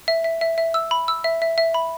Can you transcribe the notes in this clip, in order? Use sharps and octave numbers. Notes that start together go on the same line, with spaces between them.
E5
E5
E5
E5
E6
B5
E6
E5
E5
E5
B5